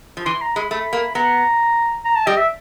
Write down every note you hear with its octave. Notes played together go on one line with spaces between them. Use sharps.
F3
E3 C6
A#5
G#3 B5
A3 B5
A#3
B3 A#5
A#5
A5
G3 D#5
E5